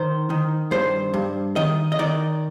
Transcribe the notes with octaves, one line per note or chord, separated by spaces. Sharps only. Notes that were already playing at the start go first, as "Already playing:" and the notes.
Already playing: D#3 C5
D#3
G2 C5
G2
D#3 D#5
D#5
D#3 D5